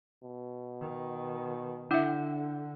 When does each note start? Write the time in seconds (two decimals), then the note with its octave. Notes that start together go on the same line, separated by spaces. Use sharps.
0.23 B2
0.81 D#3
1.91 D3 D4 E4 E5 F#5